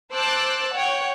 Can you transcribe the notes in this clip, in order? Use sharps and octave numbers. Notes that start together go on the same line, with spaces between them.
C5 A5 D6 E6 F#6 A6
C#5 F#5 G5